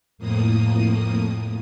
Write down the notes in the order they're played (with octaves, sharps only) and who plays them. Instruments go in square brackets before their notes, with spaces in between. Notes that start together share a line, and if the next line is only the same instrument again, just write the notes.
[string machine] F2 A2 A#3 D#6